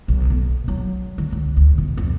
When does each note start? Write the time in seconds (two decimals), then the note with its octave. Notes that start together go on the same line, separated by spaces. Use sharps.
0.08 B1
0.30 B2
0.68 F#3
1.18 D3
1.33 C#2
1.57 D2
1.78 B2
1.97 F2